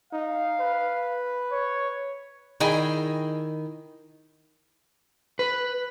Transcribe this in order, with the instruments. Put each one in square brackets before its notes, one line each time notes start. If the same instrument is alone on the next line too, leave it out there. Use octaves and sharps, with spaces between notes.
[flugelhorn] D#4 [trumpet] F5
[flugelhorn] B4
[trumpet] C#5
[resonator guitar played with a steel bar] D#3 E4 G#4 D#5 G5 G#5
[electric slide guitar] B4